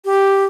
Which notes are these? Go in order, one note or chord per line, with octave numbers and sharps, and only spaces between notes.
G4